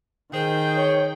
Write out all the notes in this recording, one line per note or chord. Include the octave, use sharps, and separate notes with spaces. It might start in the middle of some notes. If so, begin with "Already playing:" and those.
D#3 G#4 C5 G5
C#5